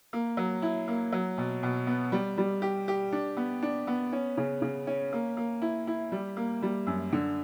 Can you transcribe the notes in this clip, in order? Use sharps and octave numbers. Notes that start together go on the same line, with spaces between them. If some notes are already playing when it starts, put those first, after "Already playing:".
A#3
F#3
E4
A#3
F#3
B2
B2
B3
G3
G3
G4
G4
D4
B3
D4
B3
C#4
C#3
C#3
C#4
A#3
A#3
E4
E4
G3
A#3
G3
F#2
D3